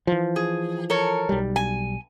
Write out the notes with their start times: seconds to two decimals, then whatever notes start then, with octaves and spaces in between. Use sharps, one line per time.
0.07 E3 F3
0.36 G#4
0.90 A4 A#4 C#5
1.29 B1 G3
1.56 G#5